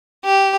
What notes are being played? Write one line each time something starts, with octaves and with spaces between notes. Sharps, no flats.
G4